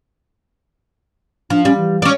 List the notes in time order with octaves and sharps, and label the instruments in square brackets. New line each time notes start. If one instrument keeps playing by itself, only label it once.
[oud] F3 [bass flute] D4
[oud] G3 [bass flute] C#4
[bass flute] E3
[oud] C#4 D5